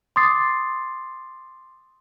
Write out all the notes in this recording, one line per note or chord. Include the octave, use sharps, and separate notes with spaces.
C6 D6 D#6 A6 C7